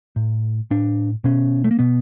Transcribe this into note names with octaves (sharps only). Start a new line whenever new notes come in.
A2
A2 D4
B2 C#4
A3
A#3
B2 B3